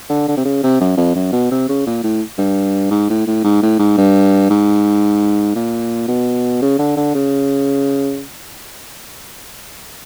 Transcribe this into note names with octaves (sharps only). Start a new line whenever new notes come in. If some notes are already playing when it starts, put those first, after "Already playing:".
D3
D3
C3
C#3
C3
F#2
F2
F#2
B2
C3
C#3
A#2
A2
G2
G#2
A2
A2
G#2
A2
G#2
G2
G#2
A#2
B2
C#3
D3
D3
C#3